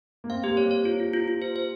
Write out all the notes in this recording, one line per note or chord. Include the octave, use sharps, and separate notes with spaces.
A#3
C4 F5
A#3 G4
G3 C#5
C#5
F4
F4
F4
F4
C5
C5